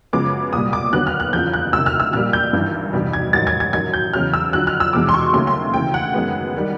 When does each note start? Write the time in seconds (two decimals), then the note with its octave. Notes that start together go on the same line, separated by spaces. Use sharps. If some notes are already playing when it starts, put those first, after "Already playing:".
0.13 F#2 C#3 F3 G#3 B3 D6
0.53 C2 A#2 G3 D#6
0.73 D6
0.93 D#2 D3 F#3 B3 F#6
1.07 F6
1.20 F#6
1.33 F#1 E2 C#3 F3 G6
1.54 F#6
1.73 D2 C3 D#3 E6
1.86 F6
2.00 E6
2.13 A#1 A#2 G3 A#3 F6
2.33 G6
2.53 G#1 G2 E3
2.93 F1 E2 B2 G3
3.13 G#6
3.33 A1 G#2 D#3 F#3 A6
3.47 G#6
3.60 G#6
3.73 F#2 D#3 F#3 G#6
3.93 G6
4.13 E2 C#3 F#3 F6
4.34 E6
4.53 F2 D3 F#3 F#6
4.67 F6
4.80 E6
4.93 F1 E2 B2 G#3 D6
5.09 C6
5.14 C#6
5.33 D#2 C#3 F#3 A3 C6
5.47 C6
5.74 D2 C#3 E3 G5
5.94 F#5
6.14 F#2 D#3 G#3 B3
6.56 D#3 G3